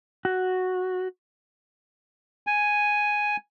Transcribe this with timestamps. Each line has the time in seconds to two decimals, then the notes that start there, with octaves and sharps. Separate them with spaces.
0.25 F#4
2.47 G#5